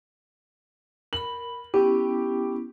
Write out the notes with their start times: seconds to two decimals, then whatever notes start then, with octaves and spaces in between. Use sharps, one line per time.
1.13 A#4 B5 F#7
1.74 B3 C#4 E4 G4